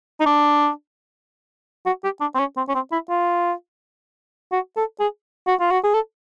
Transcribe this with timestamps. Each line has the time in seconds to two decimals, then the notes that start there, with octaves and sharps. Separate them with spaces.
0.20 D#4
0.26 D4
1.86 F#4
2.04 G4
2.21 D4
2.35 C4
2.39 C#4
2.57 C4
2.69 C#4
2.75 C4
2.92 E4
3.09 F4
4.52 F#4
4.76 A4
5.00 G#4
5.47 F#4
5.60 F4
5.71 F#4
5.84 G#4
5.94 A4